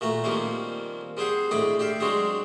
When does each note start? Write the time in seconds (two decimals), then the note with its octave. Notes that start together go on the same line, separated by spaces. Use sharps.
0.01 A#2 A3 F#4 A#5
0.24 D#3 F3 G3 A#3 C4 C#4
1.17 G3 C4 G#4 C5 F#5
1.51 D2 A2 G#4 D#5 B5 D6
1.79 G4 D5 E5 F5
2.00 F#3 G#3 C4 D4 F#4 G#4